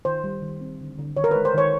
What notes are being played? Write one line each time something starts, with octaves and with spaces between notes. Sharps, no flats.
D#3 C5
G3
D#3
C4
D3
D3
D#3 C#5
A#4
G#3 B4
C5
D#3 C#5